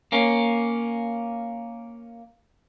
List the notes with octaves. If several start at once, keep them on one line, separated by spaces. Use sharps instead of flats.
A#3 C#4